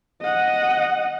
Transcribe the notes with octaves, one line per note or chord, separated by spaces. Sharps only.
D#5 F#5